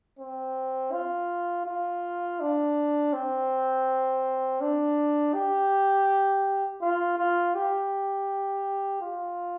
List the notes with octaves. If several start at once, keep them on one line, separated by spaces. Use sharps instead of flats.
C4
F4
F4
D4
C4
D4
G4
F4
F4
G4
F4